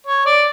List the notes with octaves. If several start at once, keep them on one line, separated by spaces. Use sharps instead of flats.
C#5
D5